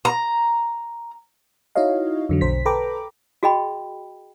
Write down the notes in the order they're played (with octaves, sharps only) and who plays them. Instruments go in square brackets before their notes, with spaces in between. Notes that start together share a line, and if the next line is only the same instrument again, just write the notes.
[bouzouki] A#5
[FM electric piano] D#4 E4 F#4 C#5 D#5 F5
F2 D3 F#3
B1 C5 B6
A4 B4 G5 A#5 B5 D6
[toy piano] F#4 G#4 D#5 G5 B5